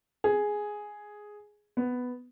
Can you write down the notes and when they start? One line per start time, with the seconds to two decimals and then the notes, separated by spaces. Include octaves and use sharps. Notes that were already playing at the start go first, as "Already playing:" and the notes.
0.24 G#4
1.77 B3